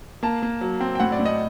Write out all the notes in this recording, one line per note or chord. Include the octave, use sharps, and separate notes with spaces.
A#3 A5
A#3
F#3
C4
G5
A2 F#5
D5
A2
D#5